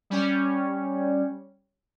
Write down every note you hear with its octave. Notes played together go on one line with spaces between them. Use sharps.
G3 C#4